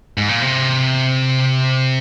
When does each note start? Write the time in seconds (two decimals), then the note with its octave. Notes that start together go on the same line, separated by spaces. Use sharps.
0.18 G#2
0.29 A#2
0.42 C3